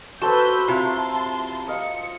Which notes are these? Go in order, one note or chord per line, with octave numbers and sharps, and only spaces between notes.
F#4 A4 B4 C5 A5 E6 G6
C3 E4 F4 A5 A#5 C6
D#5 F5 C#7